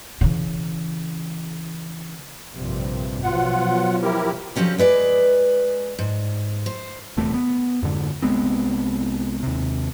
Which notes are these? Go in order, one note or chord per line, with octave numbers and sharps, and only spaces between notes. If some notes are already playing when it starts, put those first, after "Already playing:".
C#3 E3
A#1 G2 C3
B2 F3 F#3 F4 F#5
E4 G4 A#4
D3 F3 F#3 C#4 G4
G#3 B4 D5
G#2
C5
D#1 E2 C3 A3
B3
F2 G#2 D3
C2 G#3 B3 C4
D#2 C3